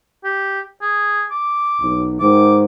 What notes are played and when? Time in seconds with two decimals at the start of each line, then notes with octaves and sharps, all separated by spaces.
0.24 G4
0.82 G#4
1.31 D6
1.81 B1
2.20 G#2 D#3 D6